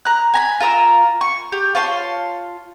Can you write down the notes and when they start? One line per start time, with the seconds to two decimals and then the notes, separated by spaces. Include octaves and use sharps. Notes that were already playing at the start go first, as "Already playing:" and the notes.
0.05 A#5 F#6
0.34 G#5 A#5 B5
0.60 F4 A#4 A#5 E6
1.21 C#6
1.52 G4
1.75 F4 C#5 A5 C6